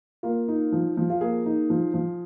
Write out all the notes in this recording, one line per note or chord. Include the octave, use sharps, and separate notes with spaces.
A#3 F4
D#4
F3
F3
F4
A#3 G#4
D#4
F3
F3